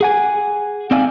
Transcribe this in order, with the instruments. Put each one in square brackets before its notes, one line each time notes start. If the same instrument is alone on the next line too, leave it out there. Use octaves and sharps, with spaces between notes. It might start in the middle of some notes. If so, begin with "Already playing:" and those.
[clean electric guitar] G#4 F#5 G#5
C4 D#4 D5 E5 F5 G#5